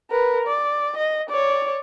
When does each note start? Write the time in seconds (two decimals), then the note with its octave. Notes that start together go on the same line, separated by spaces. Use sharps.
0.10 A#4 B4
0.47 D5
0.97 D#5
1.29 C#5 D5